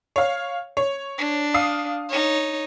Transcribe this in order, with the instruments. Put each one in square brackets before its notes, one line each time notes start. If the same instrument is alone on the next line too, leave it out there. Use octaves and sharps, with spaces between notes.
[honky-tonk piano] C#5 F5
C#5
[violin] D4
[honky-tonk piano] F5 D#6 C7
[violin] D#4 C#5